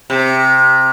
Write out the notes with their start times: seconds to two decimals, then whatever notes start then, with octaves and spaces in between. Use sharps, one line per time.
0.10 C3